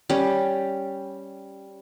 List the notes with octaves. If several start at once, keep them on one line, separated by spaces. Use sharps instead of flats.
G3 C#4